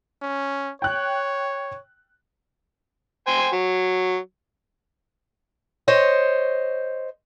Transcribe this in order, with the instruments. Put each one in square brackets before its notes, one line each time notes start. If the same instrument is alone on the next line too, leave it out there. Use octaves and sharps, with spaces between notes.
[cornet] C#4
[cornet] C#5 [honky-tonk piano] G5 F#6
[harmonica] C5 G5 G#5
F#3
[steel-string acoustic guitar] C5 C#5 D#5